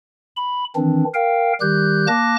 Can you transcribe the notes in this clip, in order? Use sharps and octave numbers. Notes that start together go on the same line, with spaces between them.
B5
D#3 E3 C4 D4
A#4 F5 G5
D#3 G3 G4 F#6 G6
A#3 A5 D6 F#6 A#6